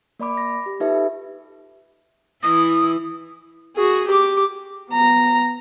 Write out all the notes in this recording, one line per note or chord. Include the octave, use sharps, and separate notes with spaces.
A#3 D5 B5 D6
A#6
G4
D#4 F4 G4 A4 B4 E5
E3 E4 D#6
F#4 G#4
G4 D6
B3 A#5